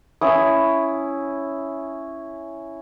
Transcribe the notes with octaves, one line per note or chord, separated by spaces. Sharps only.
C#4 E4 D#6